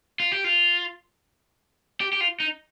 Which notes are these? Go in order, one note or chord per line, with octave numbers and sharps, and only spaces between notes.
F4
G4
F4
G4
G4
F4
D#4